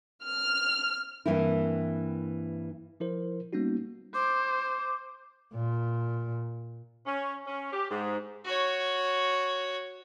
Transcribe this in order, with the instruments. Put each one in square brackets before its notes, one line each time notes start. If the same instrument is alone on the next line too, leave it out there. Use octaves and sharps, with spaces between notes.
[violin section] F6
[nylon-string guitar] G2 E3 A#3 C4 E4
[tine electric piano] F3 E4 A#4 C5
G3 A#3 B3 C#4 D#4 F#4
[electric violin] C5 [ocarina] D6
[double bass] A#2
[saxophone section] C#4
C#4
G4
G#2
[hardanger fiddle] F#4 C#5